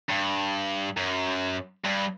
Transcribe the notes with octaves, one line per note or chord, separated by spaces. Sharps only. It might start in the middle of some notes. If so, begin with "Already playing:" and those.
G2
F#2
G2